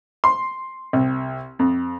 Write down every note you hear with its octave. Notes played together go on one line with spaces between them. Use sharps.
C6
C2
F2